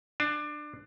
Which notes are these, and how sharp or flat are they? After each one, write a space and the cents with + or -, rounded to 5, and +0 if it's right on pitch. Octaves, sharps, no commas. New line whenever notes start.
D4 +20 A5 -45